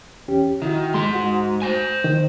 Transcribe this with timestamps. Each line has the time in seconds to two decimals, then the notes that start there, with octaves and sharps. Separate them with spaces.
0.28 E2 C#4 G4
0.62 D#3 E4 F#4
0.94 G#2 G#3 C6
1.15 F#4
1.62 C5 G#5
2.04 D#3